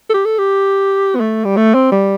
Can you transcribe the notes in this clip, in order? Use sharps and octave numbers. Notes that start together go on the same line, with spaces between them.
A4
G4
A4
G4
B3
A3
G3
A3
C4
G3